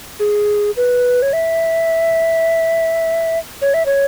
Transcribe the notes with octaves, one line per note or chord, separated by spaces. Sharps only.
G#4
B4
C#5
E5
C#5
E5
C#5